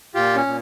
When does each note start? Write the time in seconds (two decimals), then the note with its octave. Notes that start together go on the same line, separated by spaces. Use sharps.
0.15 A#2 F4 G4
0.36 C#4
0.46 A#2